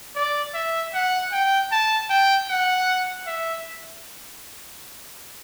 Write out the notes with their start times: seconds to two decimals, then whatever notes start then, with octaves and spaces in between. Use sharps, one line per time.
0.15 D5
0.54 E5
0.93 F#5
1.32 G5
1.71 A5
2.09 G5
2.49 F#5
3.26 E5